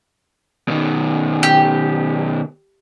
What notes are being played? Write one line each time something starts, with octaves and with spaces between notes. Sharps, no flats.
B2 D#3
G4